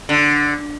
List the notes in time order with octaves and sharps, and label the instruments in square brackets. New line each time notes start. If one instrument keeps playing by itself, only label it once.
[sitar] D3